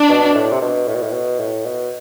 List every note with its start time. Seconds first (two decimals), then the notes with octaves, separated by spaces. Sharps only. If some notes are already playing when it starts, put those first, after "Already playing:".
Already playing: D4
0.09 B2
0.35 A2
0.51 C3
0.61 B2
0.88 A2
0.95 B2
1.03 A2
1.13 B2
1.39 A2
1.66 B2